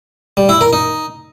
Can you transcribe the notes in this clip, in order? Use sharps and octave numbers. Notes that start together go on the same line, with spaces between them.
G3
E4
A#4
D#4